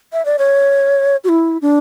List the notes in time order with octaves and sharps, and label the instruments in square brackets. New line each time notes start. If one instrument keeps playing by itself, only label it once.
[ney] E5
D5
C#5
F#4
E4
D4